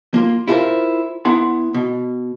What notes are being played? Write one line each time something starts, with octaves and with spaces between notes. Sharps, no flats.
A#3 F4
E4 F4 G4 A4 A#4 C5
B3 E4 F#5 C6
B2